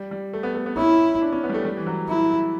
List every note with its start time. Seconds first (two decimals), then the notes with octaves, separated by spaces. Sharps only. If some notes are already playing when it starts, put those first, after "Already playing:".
Already playing: G3
0.11 G3
0.33 A3
0.43 B3
0.54 A3
0.66 B3
0.77 C#4 E4
1.21 D4
1.32 C#4
1.43 B3
1.49 G3
1.54 A3
1.65 G3
1.77 E3
1.86 F#3
2.09 E4